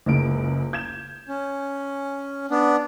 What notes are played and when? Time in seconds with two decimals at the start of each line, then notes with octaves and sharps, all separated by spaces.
0.06 F#1 C#2 D7
0.73 G6 G#6 E7
1.28 C#4
2.51 B3 D4